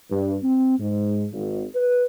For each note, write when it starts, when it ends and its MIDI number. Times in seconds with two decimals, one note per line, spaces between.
0.10 0.35 43
0.43 0.78 60
0.79 1.26 44
1.32 1.63 32
1.75 2.05 71